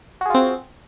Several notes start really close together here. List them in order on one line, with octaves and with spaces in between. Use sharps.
F#4 G#4 F4 C4